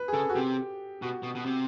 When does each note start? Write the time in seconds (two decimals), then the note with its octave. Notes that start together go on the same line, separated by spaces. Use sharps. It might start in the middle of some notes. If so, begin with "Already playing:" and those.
Already playing: B4
0.08 G#4
0.13 C#3 A4
0.29 F#4
0.35 C3 G4
1.02 B2 F#4
1.23 B2
1.35 B2
1.46 C3